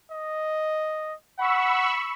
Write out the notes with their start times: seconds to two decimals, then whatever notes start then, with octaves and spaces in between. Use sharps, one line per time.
0.11 D#5
1.39 F#5 B5 C#6 E6